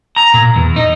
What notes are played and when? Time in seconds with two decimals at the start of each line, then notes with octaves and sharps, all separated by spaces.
0.16 A#5
0.34 A#2
0.56 E2
0.76 D#4